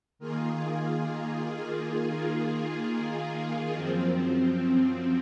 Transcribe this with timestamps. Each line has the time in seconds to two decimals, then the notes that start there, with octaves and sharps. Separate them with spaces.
0.19 D#3 A#3 F4 G#4
3.74 F#2 F3 C4